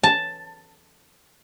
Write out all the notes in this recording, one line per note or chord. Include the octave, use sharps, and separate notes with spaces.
A5